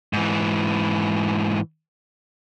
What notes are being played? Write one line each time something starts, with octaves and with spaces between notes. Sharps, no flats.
G#2 E3